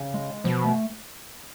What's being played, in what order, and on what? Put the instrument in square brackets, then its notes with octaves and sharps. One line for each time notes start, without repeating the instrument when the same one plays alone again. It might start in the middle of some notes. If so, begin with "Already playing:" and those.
Already playing: [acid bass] C#3
[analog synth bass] G#3
[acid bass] B2 [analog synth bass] F3
[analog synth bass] A3